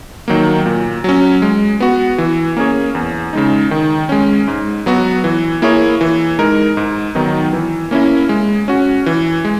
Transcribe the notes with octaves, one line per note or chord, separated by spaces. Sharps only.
D#3 F#3 A#3
A#2
F#3 C#4
G#3
B3 F#4
E3
A#3 C#4 G#4 C#5
E2
C#3 G#3 D#4
D#3
G#3 C#4
G#2
F#3 B3 F#4
E3
A#3 E4 G#4 C#5
E3
G#3 D#4 A#4
G#2
D#3 F#3 B3 D#4
E3
A#3 C#4 E4
G#3
C#4 F#4
E3
G#3